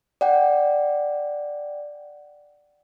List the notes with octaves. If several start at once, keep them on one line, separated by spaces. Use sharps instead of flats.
D5 F#5 G5